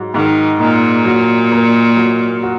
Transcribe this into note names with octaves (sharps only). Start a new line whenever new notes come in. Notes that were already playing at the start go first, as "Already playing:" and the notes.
Already playing: G#2 F#3
G#2 D#3
A#2 D#4
F#3
A#3
F#3
F#4